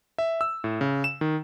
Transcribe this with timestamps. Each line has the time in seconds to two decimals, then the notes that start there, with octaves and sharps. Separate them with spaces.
0.18 E5
0.41 E6
0.64 A2
0.81 C#3
1.04 E7
1.21 D#3